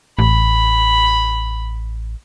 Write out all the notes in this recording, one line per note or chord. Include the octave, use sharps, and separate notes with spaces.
A1 B5